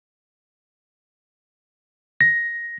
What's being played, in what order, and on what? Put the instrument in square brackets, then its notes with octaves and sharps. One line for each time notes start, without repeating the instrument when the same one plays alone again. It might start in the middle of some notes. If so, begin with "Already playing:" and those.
[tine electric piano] A#6